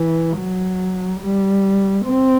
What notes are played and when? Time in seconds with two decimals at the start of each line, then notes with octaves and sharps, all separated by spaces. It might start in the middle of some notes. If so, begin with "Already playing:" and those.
Already playing: E3
0.37 F#3
1.21 G3
2.05 C4